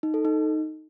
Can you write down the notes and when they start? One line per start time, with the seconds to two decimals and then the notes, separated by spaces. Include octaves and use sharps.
0.03 D#4
0.14 A4
0.25 D#4